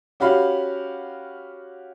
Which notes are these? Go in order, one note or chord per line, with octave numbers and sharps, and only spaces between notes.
C#4 F#4 G4 F5 B5